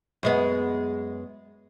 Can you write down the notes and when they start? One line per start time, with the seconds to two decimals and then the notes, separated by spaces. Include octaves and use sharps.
0.23 F#2 G#3 B3